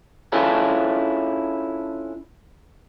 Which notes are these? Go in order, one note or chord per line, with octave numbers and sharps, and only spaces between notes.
C#4 D4 E4 F4 G#4 A4